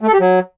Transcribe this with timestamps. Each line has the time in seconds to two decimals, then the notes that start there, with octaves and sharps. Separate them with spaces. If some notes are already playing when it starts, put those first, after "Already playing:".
0.01 A3
0.08 A4
0.14 G4
0.20 F#3